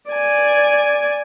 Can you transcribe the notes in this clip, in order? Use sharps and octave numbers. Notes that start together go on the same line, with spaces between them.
D5 G#5